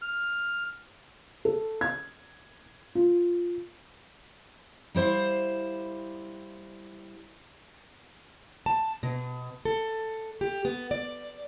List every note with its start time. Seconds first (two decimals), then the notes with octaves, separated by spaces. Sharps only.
0.02 F6
1.45 A4
1.81 G#6
2.95 F4
4.95 G3 E4 C5 F5
8.66 A5
9.03 B2
9.65 A4
10.41 G4
10.65 B3
10.91 D5